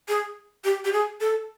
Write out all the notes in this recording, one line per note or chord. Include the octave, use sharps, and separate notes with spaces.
G#4
G4
G4
G#4
A4